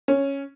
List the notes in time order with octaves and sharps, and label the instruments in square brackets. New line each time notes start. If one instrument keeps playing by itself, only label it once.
[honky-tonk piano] C#4